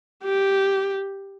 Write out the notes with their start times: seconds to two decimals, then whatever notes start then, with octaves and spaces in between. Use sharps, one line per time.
0.24 G4